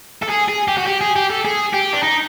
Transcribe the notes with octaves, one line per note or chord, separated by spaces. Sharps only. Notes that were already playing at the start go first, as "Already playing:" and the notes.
A4
G#4
G#4
G4
F#4
G4
G#4
G4
A4
G#4
G4
D4
D#4